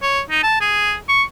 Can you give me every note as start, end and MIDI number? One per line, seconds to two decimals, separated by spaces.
0.02 0.21 73
0.30 0.43 63
0.43 0.56 81
0.61 0.95 68
1.09 1.23 85